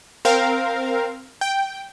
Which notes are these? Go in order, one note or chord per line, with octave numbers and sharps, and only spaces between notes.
C4 A#4 F5
G5